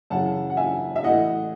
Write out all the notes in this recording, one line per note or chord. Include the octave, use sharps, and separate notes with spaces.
F#2 C#3 E3 F#5 A5
F#5
E5 G#5
E5
A2 E3 D#5 F#5